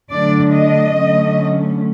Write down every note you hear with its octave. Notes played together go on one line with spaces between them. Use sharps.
D3 F#3 A3 D4 D5
D#5
D3 F#3 A3 C#4